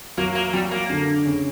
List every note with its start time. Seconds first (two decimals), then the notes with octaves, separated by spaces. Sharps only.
0.17 F#3 A#3 F#4
0.35 A#3
0.53 F#3 G3 F#4
0.71 A#3
0.90 D3 D4
1.25 C#3 C#4